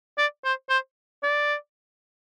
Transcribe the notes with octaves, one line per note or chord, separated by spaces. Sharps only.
D5
C5
C5
D5